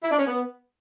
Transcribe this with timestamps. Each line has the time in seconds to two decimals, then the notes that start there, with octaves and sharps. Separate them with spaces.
0.03 E4
0.11 D4
0.19 C#4
0.26 B3